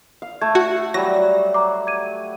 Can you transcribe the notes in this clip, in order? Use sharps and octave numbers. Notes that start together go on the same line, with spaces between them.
F5
A3 G#6
F#4
F#3 G3 A#6
D5 A#5 D6
G#6 D#7